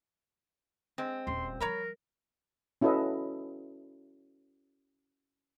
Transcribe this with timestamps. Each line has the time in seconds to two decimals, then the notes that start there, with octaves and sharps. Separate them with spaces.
0.98 G#3 C4
1.27 D#1 C#4 C6
1.61 F3 G3 A#4 C#5 A#5 B5
2.81 C#4 E4 F#4 A4 B4 D#5